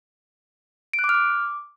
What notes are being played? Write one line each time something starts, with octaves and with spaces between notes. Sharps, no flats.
D7
F#6
D6
F6
D6